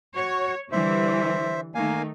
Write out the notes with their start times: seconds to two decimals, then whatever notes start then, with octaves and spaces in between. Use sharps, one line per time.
0.16 F#4 C#5
0.72 D3 E3 G3 C5 E5
1.75 D#3 A3 A#3 D#4 F5 G#5